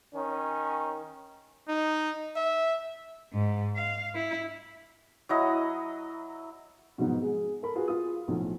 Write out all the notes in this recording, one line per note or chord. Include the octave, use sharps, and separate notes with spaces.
D#3 C#4
D#4
E5
G#2
F5
E4
F#3 E4 D#5
G#2 B2 F3 F#3 B3 D#4
G#3 G#4
A4 A#4 B5
F4 F#4 G#4 B4
F4 G#4 D#6
B1 A2 F3 F#3